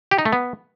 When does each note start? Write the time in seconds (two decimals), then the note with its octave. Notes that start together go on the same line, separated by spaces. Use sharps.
0.11 G4
0.18 D#4
0.25 A3
0.33 B3